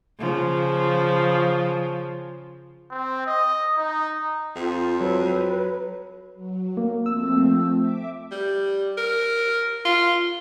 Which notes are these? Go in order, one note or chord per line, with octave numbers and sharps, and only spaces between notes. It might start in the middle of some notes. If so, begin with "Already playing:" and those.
C#3 F3
C4
D#5
D#4
F2 F4
F#3 B4
F#3
A#3
F3 A3 C4 E6
E5 D6
G3
A#4
F4